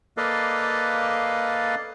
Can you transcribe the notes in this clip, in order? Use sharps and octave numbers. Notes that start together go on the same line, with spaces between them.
A#3 A4 B4 D5 D#5 F5